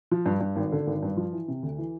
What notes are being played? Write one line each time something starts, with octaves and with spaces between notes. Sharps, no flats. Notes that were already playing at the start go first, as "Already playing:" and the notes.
F3
G2
G2
G#1
D3
G#1
G2
F3
E3
C3
D2
E3